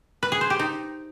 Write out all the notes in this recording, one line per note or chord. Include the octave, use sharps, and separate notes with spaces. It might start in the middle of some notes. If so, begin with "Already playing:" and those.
B4
G#4
C5
G4
D#4